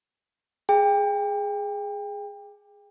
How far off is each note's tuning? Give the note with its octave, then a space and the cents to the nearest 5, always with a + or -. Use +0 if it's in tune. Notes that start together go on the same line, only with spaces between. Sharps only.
G#4 +0 G5 +30